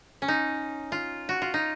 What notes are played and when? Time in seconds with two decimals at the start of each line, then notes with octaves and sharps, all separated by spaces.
0.22 C#4
0.28 D#4
0.92 F4
1.29 F#4
1.42 F4
1.54 D#4